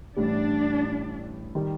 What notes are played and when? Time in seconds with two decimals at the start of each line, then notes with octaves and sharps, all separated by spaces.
0.16 A1 A2 G3 D4
1.55 D#3 G3